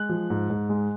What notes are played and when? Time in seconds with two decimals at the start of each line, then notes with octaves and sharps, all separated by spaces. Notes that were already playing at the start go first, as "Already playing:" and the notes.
Already playing: G#3 F#6
0.09 F3
0.30 G#2
0.50 G#2
0.69 G#3